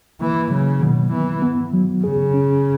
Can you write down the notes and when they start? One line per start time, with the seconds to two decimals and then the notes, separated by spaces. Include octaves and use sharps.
0.21 E3 A#3
0.51 C#3 F#3
0.81 B2 D#3
1.12 E3 B3
1.42 B3
1.74 F#3
2.04 C#3 G#4
2.34 C#4